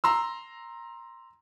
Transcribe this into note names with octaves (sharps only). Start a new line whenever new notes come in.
A#5 C6 E6